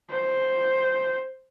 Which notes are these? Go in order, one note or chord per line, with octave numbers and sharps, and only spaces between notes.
C5